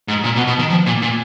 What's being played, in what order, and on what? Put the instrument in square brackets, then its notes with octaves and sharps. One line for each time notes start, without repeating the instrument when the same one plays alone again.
[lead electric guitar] G#2
A#2
B2
B2
D#3
F3
A#2
A#2